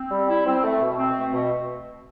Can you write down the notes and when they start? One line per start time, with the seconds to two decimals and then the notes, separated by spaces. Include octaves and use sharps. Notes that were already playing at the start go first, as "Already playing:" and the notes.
Already playing: C4
0.11 G3
0.29 E4
0.46 C4
0.64 A3
0.81 B2
0.98 C4
1.16 A3
1.33 B2